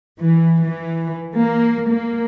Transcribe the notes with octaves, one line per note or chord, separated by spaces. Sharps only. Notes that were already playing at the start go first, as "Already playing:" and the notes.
E3
E3
A#3
A#3